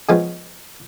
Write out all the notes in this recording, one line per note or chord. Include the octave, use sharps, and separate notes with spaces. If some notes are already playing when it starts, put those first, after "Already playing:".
C#3 F3 G#3 B3 C#4